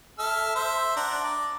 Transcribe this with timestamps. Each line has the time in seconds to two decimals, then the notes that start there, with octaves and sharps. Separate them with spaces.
0.19 A4 E5 F6
0.56 C5 E5
0.97 D4 F#5 A#5
1.24 D5